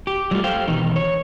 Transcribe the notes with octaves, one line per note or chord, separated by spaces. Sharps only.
G4
F#3 G3 A3 F4
G4 A4 C5 F5 G5
B2 D#3 E3 D#4
C#5